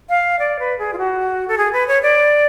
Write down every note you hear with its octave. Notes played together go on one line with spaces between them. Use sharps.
F5
D5
B4
G#4
F4
F#4
A4
G#4
B4
C#5
D5